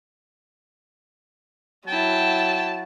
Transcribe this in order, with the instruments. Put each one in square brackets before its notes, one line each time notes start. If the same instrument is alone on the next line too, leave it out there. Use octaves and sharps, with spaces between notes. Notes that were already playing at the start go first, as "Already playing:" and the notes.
[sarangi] F#3 [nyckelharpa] E4 G5 [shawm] A5